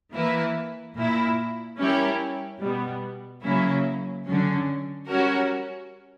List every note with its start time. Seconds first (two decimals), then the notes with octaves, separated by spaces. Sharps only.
0.13 E3 A#3 E4 B4
0.94 A#2 A#3 E4
1.77 G3 C#4 E4 G4 A#4
2.60 B2 G3 B3
3.43 C#3 F#3 A#3 C#4 E4
4.25 D3 F#3 C#4
5.07 G3 C#4 F#4 A#4